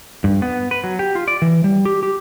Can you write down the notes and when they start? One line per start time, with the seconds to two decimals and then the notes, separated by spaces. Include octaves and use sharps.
0.24 G2
0.42 B3
0.71 B4
0.84 F#3
0.99 G4
1.15 F4
1.28 D5
1.42 E3
1.64 G3
1.85 G4
2.03 G4